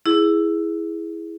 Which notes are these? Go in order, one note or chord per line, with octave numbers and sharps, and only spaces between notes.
E4 G#4